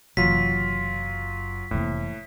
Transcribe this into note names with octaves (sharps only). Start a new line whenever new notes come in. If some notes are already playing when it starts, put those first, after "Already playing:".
F#1 C3 E3 F#3 F4 B6
F1 A2 C3 E3 A#3